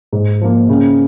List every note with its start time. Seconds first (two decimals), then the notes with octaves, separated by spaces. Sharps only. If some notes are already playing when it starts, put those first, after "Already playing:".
0.12 G#2
0.41 F3 A#3
0.69 C#3